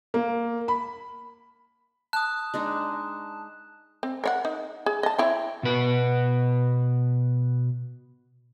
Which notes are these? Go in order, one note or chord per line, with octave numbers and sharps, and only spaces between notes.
A#3
B5
A5 D#6 F#6
G#3 D4 D#4
C4
A#4 C#5 F#5
D#4
G#4
D#5 A5
C4 E4 C#5
B2 B4